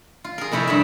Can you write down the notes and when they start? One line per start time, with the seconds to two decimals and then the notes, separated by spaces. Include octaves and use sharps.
0.24 F4
0.38 G#4 A#4
0.52 F2 C3 E4 C#5 F5
0.67 G2 G3 E5